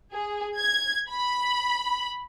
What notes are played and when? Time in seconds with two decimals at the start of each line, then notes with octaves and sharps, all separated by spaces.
0.12 G#4
0.58 G#6
1.11 B5